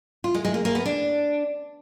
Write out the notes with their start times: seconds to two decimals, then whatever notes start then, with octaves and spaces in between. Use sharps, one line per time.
0.24 F4
0.34 G#3
0.45 G#3
0.54 A#3
0.65 A#3
0.75 B3
0.86 D4